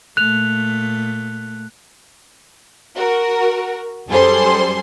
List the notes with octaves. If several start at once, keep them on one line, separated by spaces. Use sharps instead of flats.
A#2 A3 F#6 F7
F#4 A#4
F#2 G3 G#4 A4 C5 C6